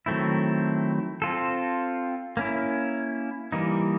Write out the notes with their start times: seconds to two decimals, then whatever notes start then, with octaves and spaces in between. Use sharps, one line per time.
0.06 D#3 F#3 A3 C4 E4
1.22 C4 F4 A4
2.37 A#3 C#4 E4
3.52 E3 G3 A#3 D#4